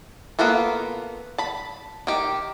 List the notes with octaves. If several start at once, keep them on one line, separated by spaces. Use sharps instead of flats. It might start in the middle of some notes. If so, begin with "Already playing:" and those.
A#3 B3 F4 A4 B4
A5 B5
D#3 G4